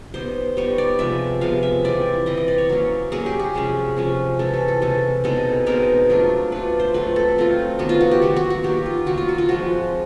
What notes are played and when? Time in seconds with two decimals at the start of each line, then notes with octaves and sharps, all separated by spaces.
0.14 G3 B3 D#4 C5
0.57 G3 B3 D#4 C#5
0.78 D5
0.99 C3 F3 G#3 B3 E5
1.41 C3 F3 G#3 B3 F5
1.63 E5
1.84 E3 G3 C4 E4 D5
2.26 E3 G3 C4 E4 D#5
2.37 D#5
2.48 D5
2.58 C#5
2.69 F#3 A#3 C#4
3.12 F#3 A#3 C#4 G#4
3.26 G4
3.40 G#4
3.55 C3 F3 G#3 C#4
3.97 C3 F3 G#3 C#4
4.39 C3 E3 G#3 C#4 A4
4.54 A4
4.68 A4
4.82 C3 E3 G#3 C#4 A4
5.24 B2 G#3 C4 D#4 A4
5.66 B2 G#3 C4 D#4 A#4
6.10 F#3 A3 D4 F4
6.52 F#3 A3 D4 F4 B4
6.80 C5
6.94 F#3 A3 C4 F4 B4
7.16 A4
7.36 F#3 A3 C4 F4
7.79 D#3 F#3 B3 F#4
7.89 F4
8.01 F#4
8.11 G4
8.22 D#3 F#3 B3 F#4
8.36 F#4
8.50 F#4
8.64 D#3 F#3 A#3 G4
8.86 F4
9.06 D#3 F#3 A#3 F#4
9.18 F4
9.28 F#4
9.38 F4
9.48 F3 G#3 C4 F#4